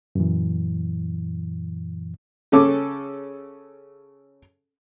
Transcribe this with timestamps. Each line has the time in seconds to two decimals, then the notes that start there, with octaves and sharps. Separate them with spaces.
0.15 F#2 A#2 E3
2.52 C#3 C#4 A4 D6